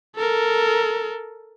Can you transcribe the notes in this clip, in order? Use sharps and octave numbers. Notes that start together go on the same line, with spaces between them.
A4 A#4